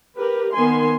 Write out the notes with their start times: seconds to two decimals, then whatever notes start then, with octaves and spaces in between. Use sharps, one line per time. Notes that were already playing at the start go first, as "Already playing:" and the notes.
0.16 G4 A#4 B4
0.52 D#3 B3 G#5 C6